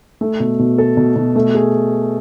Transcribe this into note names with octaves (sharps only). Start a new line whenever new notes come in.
A3
B2
B2
A4
B2
B2
A3
G#4